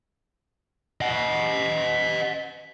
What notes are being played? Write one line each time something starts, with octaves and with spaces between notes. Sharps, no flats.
D#5 F#5